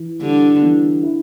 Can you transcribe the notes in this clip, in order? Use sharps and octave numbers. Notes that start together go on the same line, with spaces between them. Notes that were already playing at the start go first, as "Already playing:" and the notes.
Already playing: E3
D3 G3
E3
E4